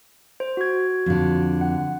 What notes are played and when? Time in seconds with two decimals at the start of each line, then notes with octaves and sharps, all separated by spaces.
0.40 C5
0.57 F#4 G#6
1.06 F2 D3
1.61 F#5